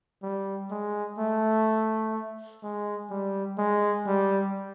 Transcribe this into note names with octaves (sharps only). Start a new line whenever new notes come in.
G3
G#3
A3
G#3
G3
G#3
G3